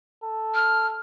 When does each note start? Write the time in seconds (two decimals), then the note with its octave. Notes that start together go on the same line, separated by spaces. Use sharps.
0.24 A4
0.55 F6